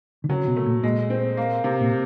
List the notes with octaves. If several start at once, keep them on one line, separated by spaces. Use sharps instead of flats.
D3
C#3 F#3
B2
A3
A#2
A#2 G#3
C4
A#3
C3
A#2